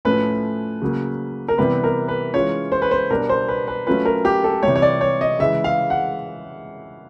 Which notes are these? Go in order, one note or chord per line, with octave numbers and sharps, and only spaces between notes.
A2 F3 A3 C#4 B4
C#3 F#3 A#3
A#4
C3 E3 G3 B3 B4
A#4
B4
E3 G#3 C#4 F4 C#5
C5
B4
C5
B2 G3 B3 D4 A#4
C5
B4
B4
F#3 A3 C#4 F4 B4
A#4
G4
A4
C3 E3 G3 C#5
C#5
D5
C#5
D#5
C#3 E3 G#3 E5
F5
F#5